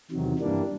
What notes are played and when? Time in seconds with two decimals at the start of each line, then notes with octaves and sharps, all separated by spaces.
0.11 E2 C3 D#3 F#3
0.39 G2 E3 G3 A#3 D4